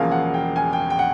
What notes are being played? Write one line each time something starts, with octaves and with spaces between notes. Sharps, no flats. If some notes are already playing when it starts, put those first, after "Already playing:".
Already playing: E1 E2 C#3 F3 A#3 F5
F#5
G5
G#5
G5
G5
F#5